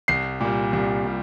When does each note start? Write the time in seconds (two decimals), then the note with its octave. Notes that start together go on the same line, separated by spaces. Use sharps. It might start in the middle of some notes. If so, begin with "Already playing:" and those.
0.08 C2 C7
0.41 A#2 G3
0.73 C2
1.05 A#2 G3